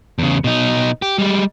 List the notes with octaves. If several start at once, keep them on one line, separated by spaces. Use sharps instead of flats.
E2 C#3
B2 D#4
G4
G3 G#3